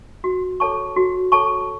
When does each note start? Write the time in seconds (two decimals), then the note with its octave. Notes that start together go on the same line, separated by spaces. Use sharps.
0.24 F#4
0.60 A4 C#5 A5 C#6
0.96 F#4
1.32 A4 C#5 A5 C#6